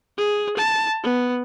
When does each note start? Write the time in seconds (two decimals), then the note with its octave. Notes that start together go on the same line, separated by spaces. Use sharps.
0.18 G#4
0.57 A5
1.04 B3